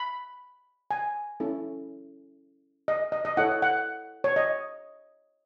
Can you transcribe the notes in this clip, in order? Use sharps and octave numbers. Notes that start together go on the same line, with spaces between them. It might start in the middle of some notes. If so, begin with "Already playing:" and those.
Already playing: B5
G#5
C#4 E4 A4
D#5
D#5
D#5
E4 A4 C#5 F#5
F#5
C#5
D#5